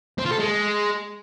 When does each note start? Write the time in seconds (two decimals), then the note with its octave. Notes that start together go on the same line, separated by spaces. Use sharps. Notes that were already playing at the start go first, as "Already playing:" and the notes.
0.18 C4
0.25 F4
0.32 A4
0.39 G#3